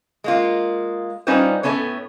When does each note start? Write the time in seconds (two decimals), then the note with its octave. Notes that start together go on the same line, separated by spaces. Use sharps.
0.24 G#3 A#3 F4
1.27 G3 C#4 D#4 F4 B4 C5
1.63 A2 A3 B3 C#4 C#5